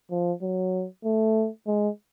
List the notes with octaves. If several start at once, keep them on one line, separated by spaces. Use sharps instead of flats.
F3
F#3
A3
G#3